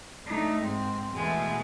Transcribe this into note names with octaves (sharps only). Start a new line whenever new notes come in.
A3 D4 D#4
G#2 G#3 C4
E2 B2 G#3 A3